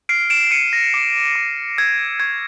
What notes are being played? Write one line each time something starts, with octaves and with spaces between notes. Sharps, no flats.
F6 C7 D7
D7 E7
F6 C#7 D#7
A#6
D6
D6
E6 G#6
C#6 G#6